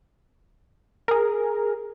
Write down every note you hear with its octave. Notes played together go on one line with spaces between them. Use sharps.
G#4 A#4